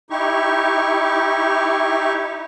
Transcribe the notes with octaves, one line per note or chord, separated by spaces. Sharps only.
D#4 E4 G4 C#6